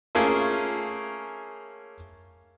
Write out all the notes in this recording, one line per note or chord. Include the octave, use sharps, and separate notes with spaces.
A3 A#3 C#4 F4 G#4 A#4